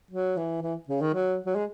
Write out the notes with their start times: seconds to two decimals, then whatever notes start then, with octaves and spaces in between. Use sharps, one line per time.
0.11 F#3
0.37 E3
0.63 E3
0.88 C#3
1.01 D#3
1.14 F#3
1.46 F#3
1.55 G#3